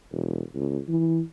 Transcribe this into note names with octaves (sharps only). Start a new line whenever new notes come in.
E1
C#2
E3